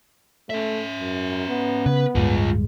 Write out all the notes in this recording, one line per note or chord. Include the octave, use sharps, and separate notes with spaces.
A3 C#4 E5
F#2
B3
C#3 B4
D1 G2 G#3 F4 G#4